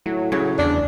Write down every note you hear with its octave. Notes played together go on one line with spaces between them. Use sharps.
A2 F#3
C#3 F#3 C#4
E2 D4